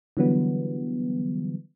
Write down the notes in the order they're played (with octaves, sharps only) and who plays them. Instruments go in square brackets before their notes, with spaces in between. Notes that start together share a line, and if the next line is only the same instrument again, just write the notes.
[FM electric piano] D3 E3 F#3 G3 B3